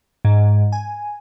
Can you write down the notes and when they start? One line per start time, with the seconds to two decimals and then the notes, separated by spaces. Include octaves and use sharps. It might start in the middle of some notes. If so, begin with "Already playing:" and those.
0.25 G#2
0.72 G#5